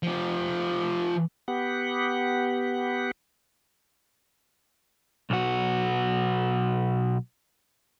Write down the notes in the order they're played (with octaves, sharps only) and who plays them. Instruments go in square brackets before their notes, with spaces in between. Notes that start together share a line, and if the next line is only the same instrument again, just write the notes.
[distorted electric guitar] F3 G4
[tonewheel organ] B3 G4 F#5
[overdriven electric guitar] B1 F#4